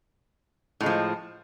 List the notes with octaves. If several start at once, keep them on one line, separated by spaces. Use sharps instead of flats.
A2 F3 G#3